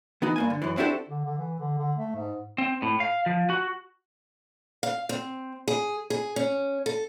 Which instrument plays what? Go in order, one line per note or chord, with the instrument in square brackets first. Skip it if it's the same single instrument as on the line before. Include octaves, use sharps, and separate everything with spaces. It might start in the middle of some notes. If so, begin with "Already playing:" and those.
[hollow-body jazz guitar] E3 B3 D#4 F#4
G2 A#3 G#5
D3
F#2 E3
C4 D4 E4 F#4 G4 A4
[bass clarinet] D3
D3
E3
D3
D3
A3
G#2
[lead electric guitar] C4
A2
F5
F3
F#4
[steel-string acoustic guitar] F5
C4
G#4
G#4
C#4
A4